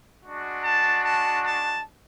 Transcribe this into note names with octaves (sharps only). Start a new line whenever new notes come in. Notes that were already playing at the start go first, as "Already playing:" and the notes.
G#3 D4 F#4
A5
A5
A5